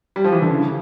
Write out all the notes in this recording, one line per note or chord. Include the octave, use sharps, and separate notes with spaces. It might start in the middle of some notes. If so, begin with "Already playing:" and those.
G3
F3
E3
D3
C#3